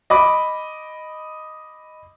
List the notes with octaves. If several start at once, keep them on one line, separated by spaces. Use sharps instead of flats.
D#5 B5 D6